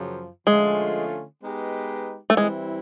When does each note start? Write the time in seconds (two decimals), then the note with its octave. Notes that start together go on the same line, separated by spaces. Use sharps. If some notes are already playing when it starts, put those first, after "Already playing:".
Already playing: F#2 C#3 F3
0.47 D3 F3 G#3 A3 C#4 F4
1.42 G#3 B3 D#4 G4 B4
2.30 A3
2.37 E3 G3 G#3 C4 E4